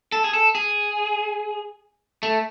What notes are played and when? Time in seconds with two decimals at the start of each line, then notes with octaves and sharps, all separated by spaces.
0.12 A4
0.24 G#4
0.33 A4
0.55 G#4
2.23 A3